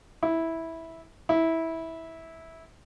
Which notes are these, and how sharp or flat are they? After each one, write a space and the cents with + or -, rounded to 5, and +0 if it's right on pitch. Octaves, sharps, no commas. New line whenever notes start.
E4 -10
E4 -15